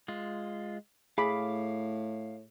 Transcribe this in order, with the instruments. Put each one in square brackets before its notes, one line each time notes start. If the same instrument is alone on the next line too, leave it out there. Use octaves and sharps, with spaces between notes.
[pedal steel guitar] G#3 F4
[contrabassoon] A2 [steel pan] G#4 B5 [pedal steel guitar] F5 D6